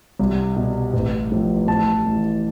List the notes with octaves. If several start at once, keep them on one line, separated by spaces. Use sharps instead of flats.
C2
B2
A1
A2 F3
A1 A5
A2 E3